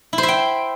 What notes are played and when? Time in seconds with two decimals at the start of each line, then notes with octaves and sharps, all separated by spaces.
0.13 E4
0.18 C5
0.23 E5
0.28 G5